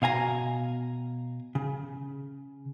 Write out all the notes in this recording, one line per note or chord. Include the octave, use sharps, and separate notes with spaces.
B2 F5 G#5 A#5
C#3